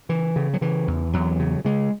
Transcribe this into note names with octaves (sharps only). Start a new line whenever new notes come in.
C#3 E3
C#3
F#3
C#3 E3
E2
E2 F#3
C#3
C#3 G#3